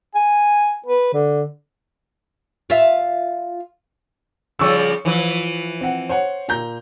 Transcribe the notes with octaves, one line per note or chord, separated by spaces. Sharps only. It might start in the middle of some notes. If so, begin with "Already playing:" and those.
G#5
B4
D3
F4 E5
C#3 F3 G3 C#5 C#6 E6
E3 F3 B4
C4 F#5
C5 C#5 F#5
A#2 A#5 G6